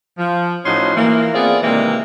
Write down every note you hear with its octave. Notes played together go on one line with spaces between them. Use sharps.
F3
A2 F3 C#4 D#4 F#4 C6
E3 A#3
B3 C4 F4 G#4 D5
C3 D#3 E3 G3 G#3 A#3